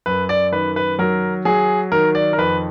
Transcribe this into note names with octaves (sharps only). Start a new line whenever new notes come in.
F#2 B4
D5
D#3 B4
B4
F#3 A#4
F#3 G#4
D#3 A#4
D5
A#4
F2 B4